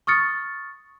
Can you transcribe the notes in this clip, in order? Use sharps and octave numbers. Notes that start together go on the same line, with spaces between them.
C#6 D#6 F6 A6 C#7